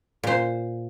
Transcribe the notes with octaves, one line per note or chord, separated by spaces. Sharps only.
A#2 C5